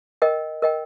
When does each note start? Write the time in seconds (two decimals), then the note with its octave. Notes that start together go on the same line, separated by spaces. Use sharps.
0.22 A#4 D#5 G5
0.62 A#4 D#5 G5